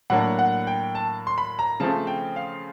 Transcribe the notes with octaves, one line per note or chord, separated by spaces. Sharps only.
A2 F#3 A#3 D4 F#5
F#5
G5
A5
C6
B5
A#5
C#3 F3 A3 C4 A5
G5
F5